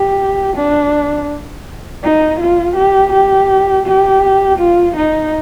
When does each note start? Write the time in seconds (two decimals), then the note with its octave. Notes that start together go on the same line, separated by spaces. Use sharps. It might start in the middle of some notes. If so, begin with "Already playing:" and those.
Already playing: G4
0.56 D4
2.03 D#4
2.40 F4
2.76 G4
3.13 G4
3.86 G4
4.58 F4
4.96 D#4